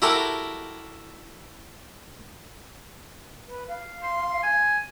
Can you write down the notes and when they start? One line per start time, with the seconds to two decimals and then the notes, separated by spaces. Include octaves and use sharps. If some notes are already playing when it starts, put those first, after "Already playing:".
0.02 E4 F#4 G4 A4 A#4
3.48 B4
3.68 F5
4.03 C6
4.43 G#5